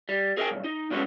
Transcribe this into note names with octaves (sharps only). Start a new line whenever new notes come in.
G3
G#4 A#4 D#5 E5 G5 G#5
B1 G2
D#4
G2 B2 F#3 G#3 B3 C#4